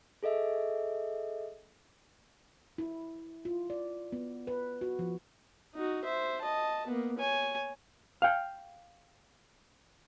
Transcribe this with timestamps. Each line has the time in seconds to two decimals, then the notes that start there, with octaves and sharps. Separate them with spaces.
0.23 G#4 A4 D#5 E5
2.78 E4
3.45 F4
3.70 D5
4.12 B3
4.47 B4
4.81 F#4
4.99 F3
5.75 D#4 F#4
6.05 C5 E5
6.42 D#5 A5
6.87 A#3 B3
7.18 C#5 G#5
8.22 F5 G5